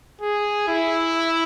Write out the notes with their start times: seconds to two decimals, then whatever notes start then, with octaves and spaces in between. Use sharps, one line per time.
0.21 G#4
0.68 E4